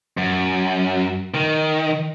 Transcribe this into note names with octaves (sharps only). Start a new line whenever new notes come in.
F#2
D#3